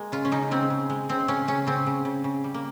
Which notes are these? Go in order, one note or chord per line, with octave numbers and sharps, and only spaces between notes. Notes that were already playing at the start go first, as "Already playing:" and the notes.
Already playing: G#3 A#3
C#3 F4
C#4
C#3 D#4
C#3 C4
C#3
G#3
C#3 C4
C#3 C#4
C#3 C#4
C#3 C4
C#3
C#3
C#3
G3
A#3